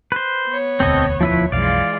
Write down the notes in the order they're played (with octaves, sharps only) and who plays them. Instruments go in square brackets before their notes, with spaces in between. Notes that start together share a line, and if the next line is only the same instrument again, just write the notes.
[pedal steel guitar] B4 C5
[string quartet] B3 C#5
[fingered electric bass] E1 D2 [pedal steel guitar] C4 A4 D#5
[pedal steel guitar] F3 E4 B4
[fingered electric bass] B1 F2 [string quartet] E3 G#3 F4 [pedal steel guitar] D5 F5